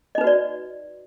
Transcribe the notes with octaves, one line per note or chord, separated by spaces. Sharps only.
D#4 F#4 B4 D5 D#5